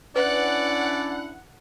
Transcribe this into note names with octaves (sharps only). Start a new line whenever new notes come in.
C#4 D4 E4 B4 D5 F#5